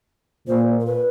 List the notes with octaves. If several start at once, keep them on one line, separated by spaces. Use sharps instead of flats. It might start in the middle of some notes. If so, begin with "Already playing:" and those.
A#2 C5
A#4
B4